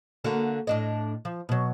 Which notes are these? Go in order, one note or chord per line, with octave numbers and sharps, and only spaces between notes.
D3 A#3 F#4
A2 D4 D#5
F3
B2 F#3